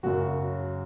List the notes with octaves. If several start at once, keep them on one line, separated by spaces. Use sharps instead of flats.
F#2 C#3 F#3 F#4